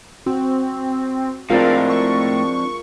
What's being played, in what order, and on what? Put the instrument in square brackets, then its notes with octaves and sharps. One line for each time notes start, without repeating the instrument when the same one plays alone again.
[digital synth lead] C4 [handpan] F#4
[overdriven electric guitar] A2 [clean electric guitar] F3 C4 D4 [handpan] G#3 F4 A#4 [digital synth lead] F5
[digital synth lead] C#6